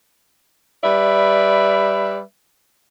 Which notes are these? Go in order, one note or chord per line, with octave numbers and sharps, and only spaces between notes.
G3 B4 D5 E5